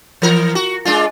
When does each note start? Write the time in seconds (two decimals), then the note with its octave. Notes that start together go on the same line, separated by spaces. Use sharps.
0.22 E3 A#4
0.55 F#4
0.85 G#3 D4 F4